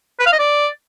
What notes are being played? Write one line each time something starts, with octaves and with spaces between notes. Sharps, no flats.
B4
F5
D#5
D5